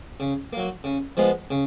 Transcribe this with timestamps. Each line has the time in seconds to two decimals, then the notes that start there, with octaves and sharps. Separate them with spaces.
0.20 C#3
0.53 F#3 A#3
0.84 C#3
1.17 F3 G#3 B3
1.51 C#3